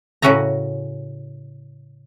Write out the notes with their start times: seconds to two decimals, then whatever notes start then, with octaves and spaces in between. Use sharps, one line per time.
0.22 A2 C#3 C#4 F#4 E5 A#5